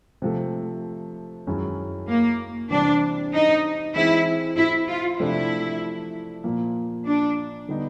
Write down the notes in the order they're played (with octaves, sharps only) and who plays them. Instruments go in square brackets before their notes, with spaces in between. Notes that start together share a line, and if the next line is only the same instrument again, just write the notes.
[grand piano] C3 F3 A3
F#2 D#3 G#3 C#4 E4
[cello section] A#3
[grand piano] C3 E3 G3 C4 [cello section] D4
[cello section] D#4
[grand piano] E3 G#3 C4 [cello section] E4
[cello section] E4
F4
[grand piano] C3 F3 A3 D4 [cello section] E4
[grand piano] A#2 F3 A#3
[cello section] D4
[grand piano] D3 G3 B3 D#4